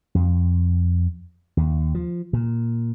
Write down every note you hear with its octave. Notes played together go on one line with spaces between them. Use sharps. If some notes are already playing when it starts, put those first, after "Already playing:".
F2
D#2
F3
A#2